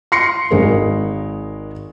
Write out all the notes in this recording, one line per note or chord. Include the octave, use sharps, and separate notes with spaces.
C6 A#6 C7 C#7
G#1 G#3 A#4